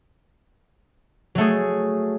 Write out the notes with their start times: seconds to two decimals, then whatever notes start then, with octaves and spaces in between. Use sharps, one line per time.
1.35 F#3
1.38 A3
1.41 G#4